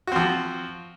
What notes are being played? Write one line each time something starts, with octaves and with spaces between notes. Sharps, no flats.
F3 C4 F#4